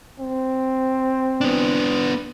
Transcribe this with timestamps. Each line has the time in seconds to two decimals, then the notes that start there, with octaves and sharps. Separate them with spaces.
0.20 C4
1.41 B3 D4